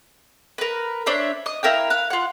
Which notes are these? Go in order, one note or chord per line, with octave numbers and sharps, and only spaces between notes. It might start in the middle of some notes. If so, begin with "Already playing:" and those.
A#4 B4
D4 C5 C#5 E5
D#5 D#6
E4 A#4 F5 G5
F5 F#6
F4 F#5